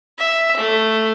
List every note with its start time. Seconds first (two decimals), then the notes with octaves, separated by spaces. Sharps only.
0.18 E5
0.57 A3